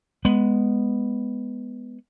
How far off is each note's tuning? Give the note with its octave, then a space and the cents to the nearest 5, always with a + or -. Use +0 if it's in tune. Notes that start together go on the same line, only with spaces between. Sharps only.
G#3 +0 B3 +0